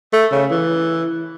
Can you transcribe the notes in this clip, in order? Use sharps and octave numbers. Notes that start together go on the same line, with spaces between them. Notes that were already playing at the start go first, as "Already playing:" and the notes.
A3
C#3
E3